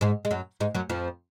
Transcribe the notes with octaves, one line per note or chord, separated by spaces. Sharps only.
G#2 G#3
G#3
F#2 F#3
G#2 G#3
F#2 F#3
F2 F3